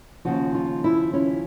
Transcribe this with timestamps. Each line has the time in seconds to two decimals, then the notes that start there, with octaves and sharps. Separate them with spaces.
0.25 D#2 C#3 F3 F#4
0.55 F4
0.84 E4
1.13 C#4